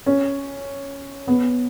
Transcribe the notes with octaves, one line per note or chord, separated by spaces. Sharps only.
C#4
B3